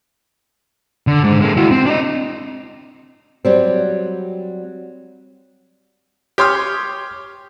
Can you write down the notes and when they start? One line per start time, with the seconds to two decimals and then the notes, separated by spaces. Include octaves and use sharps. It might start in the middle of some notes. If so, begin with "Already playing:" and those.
1.07 D3
1.24 G#2 G#3
1.41 G#3 A#3
1.57 E4 F#4
1.71 C4
1.85 D4 D#5
3.45 F#3 G3 C4
6.38 G4 C#5 C6 D#6 F6